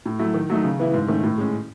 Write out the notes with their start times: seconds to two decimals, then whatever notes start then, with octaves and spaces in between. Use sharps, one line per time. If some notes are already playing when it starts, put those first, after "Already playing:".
0.06 A2
0.19 F#3 A3 E4
0.34 D#3
0.50 F#3 A3 D#4
0.64 C#3
0.79 E3 B3 E4
0.94 G#2
1.08 D#3 A3 C#4
1.24 A2
1.38 G#3 C#4